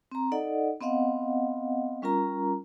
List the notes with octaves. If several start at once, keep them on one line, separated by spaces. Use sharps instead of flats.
C4 A#5
D#4 A4 D5 D#5 F#5
B3 C4 D#5 F5 F#5
G3 C#4 F4 A#4 A#5